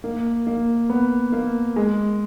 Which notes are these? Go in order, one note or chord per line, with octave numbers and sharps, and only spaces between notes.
A#3
A#3
B3
A#3
G#3